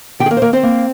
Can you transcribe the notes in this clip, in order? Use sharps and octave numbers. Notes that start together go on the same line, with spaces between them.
D#3 G4 G5
G#4
A#3 A#4
C5
D#3 A#3 A#4
C4 C5
A#3